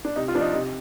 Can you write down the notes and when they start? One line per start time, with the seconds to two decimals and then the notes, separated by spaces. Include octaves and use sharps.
0.05 D4
0.16 C3 D#4
0.28 F4
0.34 F3 D4
0.41 D#4
0.53 C3 D#4